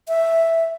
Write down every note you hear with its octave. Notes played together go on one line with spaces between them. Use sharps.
E5